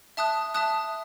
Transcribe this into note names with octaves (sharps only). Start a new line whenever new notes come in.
E5 A5 D#6 F#6
E5 A5 D#6 F#6